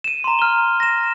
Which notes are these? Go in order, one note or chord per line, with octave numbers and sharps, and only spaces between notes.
D#7 E7
A#5 C6
F6 G7
A#6 E7